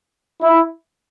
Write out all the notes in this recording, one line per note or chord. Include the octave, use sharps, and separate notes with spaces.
E4